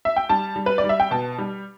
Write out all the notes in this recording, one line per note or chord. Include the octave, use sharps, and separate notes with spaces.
E5
G5
G3 A5
G3
B4
D5
G3
E5
G5
B2 A5
G3